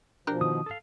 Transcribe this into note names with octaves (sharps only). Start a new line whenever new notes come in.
B2 F3 D4 G4 A#4
D#3 D#6
A4 F5